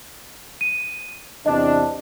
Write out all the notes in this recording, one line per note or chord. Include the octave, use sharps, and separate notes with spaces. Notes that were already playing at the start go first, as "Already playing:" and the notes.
D#7
E2 C3 D4 D#5